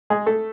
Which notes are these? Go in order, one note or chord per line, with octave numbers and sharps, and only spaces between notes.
G#3 G#4
A3 A4